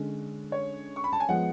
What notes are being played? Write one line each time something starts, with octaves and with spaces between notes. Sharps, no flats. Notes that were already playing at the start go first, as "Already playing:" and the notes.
Already playing: D3 G#3 C#4
C#5
C#6
B5
A5
G#5
F3 G#3 B3 F#5